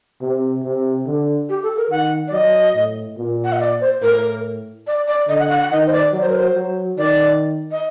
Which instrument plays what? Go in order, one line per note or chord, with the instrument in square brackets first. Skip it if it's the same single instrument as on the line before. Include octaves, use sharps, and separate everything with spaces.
[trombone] C3
C3
D3
[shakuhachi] G4
A4
A#4
[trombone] D#3 [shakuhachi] F#5
[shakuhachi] D5
[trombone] F#3 [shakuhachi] D#5
[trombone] A2
A#2
[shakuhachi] F#5
D#5
D5
C5
[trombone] A2 [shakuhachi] A#4
[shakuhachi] D5
D5
[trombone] D3 [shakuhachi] D#5
[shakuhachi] F#5
F#5
F#5
[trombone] D#3 [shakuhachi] D#5
[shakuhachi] C5
D5
[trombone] F#3 [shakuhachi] D5
[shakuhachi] C5
A#4
C5
[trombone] F#3
[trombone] D#3 [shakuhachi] D5
[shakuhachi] D#5